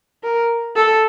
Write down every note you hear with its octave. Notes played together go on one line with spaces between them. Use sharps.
A#4
A4